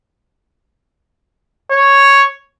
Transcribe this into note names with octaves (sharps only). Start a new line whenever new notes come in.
C#5